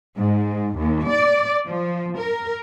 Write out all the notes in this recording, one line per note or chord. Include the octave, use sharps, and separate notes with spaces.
G#2
D#2
D5
F3
A#4